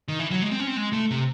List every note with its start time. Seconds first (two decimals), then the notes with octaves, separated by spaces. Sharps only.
0.08 D#3
0.19 E3
0.31 F#3
0.42 G#3
0.51 C4
0.60 C#4
0.67 C4
0.76 G#3
0.93 A3
1.11 C3